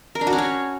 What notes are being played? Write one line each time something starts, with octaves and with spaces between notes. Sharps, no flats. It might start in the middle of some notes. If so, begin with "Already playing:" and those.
A#4
D4
F#4
C#4
C#5